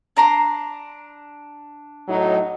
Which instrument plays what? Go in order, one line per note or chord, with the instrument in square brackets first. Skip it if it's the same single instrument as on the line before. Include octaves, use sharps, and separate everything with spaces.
[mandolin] D4 A#5 C6
[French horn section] A2 F#3 D#4